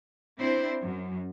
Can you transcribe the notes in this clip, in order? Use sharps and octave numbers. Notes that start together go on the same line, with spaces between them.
C4 D4 E4 C5
F#2